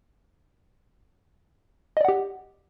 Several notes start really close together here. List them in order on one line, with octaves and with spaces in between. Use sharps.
D#5 D5 F#5 G4